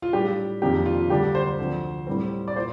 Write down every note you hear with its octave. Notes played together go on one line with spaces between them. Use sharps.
F4
A2 G3 D4 G4
F2 C3 D#3 A#3 D4 G4
F4
D2 D3 G3 D4 G4
C5
D2 C3 F3
A2 G3 C4
D5
A#2 C5